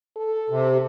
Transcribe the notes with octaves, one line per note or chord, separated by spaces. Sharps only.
A4
C3